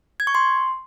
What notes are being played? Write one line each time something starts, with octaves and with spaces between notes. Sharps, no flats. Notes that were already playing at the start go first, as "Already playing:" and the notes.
G#6
C#6
C6